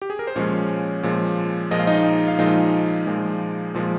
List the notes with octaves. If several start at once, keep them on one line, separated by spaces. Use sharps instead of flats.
G4
G#4
A#4
C5
A#2 F3 G#3 C#4 C#5
A#2 F3 G#3
A#2 F3 G#3 D#5
F5
D#4 D#5
F5
A#2 F3 G#3 D#4 D#5
A#2 F3 G#3
A#2 F3 G#3